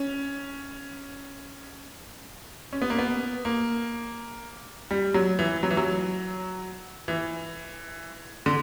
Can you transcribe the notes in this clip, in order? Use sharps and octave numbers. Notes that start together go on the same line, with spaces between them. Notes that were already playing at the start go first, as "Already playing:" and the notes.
Already playing: C#4
C#4
B3
A#3
B3
A#3
G3
F#3
E3
F#3
E3
F#3
E3
D3